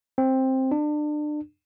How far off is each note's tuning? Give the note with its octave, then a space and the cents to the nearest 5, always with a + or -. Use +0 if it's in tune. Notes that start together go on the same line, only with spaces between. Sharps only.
C4 +10
D4 +30